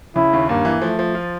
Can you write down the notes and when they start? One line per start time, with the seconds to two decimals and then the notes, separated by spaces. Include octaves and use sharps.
0.16 C#3 E4
0.33 D#2
0.49 G2 A#3
0.65 E3
0.81 F3 A3
0.99 F3
1.15 F4